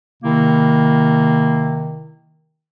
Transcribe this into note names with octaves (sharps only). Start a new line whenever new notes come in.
C3 D#3 A#3 E4